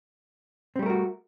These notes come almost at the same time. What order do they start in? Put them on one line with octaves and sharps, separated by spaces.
C4 G3 A3 A#4 F#4